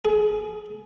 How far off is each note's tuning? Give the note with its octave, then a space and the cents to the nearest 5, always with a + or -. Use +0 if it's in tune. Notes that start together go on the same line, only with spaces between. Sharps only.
G#4 +25